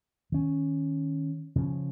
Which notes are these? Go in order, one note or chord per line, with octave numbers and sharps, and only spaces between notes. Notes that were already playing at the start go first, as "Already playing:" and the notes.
D#3 C#4
C#3 F3 C#4